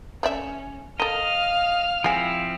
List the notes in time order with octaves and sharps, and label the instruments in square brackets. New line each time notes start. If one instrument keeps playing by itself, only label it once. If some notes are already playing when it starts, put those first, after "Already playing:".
[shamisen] A3 D5 E5 [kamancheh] C#4
[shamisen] A4 A#4 [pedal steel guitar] D#5 [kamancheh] F5 F6
[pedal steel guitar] F3 C4 E4 [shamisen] G#3 G#5